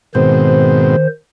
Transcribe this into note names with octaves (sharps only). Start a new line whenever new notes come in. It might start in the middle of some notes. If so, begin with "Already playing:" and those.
G#2 B2 D#3 C4 C5